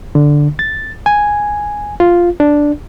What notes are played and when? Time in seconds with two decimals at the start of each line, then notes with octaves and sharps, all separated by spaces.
0.15 D3
0.59 A6
1.06 G#5
2.00 F4
2.40 D4